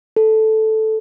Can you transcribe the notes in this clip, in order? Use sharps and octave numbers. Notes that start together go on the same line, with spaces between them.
A4